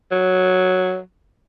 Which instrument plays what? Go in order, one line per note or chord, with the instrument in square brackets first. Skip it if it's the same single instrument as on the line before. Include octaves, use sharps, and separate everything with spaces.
[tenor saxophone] F#3